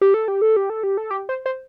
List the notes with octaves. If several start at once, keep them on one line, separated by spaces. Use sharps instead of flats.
G4
A4
G4
A4
G4
A4
G4
A4
G4
C5
C5